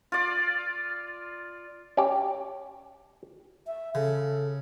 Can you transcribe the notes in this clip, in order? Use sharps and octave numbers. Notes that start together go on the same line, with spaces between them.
F4 D5
C#4 G4
E5
C#3 A4